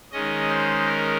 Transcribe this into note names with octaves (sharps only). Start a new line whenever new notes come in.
D#3 G#3 C#4 D#5
C5
A#4